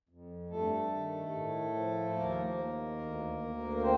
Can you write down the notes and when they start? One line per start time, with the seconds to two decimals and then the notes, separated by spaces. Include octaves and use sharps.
0.09 F2
0.50 G2 A3 A4
0.92 D#3
1.33 A2
1.75 F3
2.16 D#2 A#3 A#4
2.57 D#3
2.99 D2
3.41 D2
3.77 A#4
3.82 C4 C5